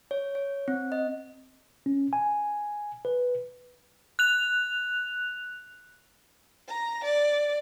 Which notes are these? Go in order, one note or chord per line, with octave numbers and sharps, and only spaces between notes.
C#5
C#5
C4
D#5
C#4
G#5
B4
F#6 F7
A#5
D5